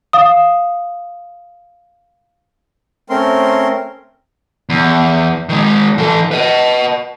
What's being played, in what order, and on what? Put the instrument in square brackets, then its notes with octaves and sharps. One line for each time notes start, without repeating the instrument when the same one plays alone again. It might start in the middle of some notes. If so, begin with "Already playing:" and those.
[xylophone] F5 D#6
[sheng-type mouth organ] A3 C4 C#4 A#4 C6
[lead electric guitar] E2
D#3 G#3
E3 A4
B4 D#5